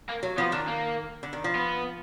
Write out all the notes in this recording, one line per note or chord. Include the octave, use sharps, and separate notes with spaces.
A#3
F#3
F3 B3
D#3 D4
A#3
D3
D#3
F3
B3